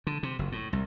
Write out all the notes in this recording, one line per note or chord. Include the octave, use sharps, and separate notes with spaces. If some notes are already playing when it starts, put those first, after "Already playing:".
D3
C3
F#1
A2
C2